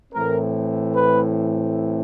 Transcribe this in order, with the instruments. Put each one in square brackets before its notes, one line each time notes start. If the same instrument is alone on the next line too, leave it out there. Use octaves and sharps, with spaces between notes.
[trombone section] A2 E3 A3 C4 A#4
B4